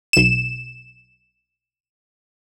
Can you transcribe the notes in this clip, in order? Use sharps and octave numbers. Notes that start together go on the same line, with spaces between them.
B1 E7